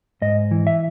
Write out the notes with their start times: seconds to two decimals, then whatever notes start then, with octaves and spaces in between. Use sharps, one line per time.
0.22 G#2 D#5
0.51 E3
0.67 E5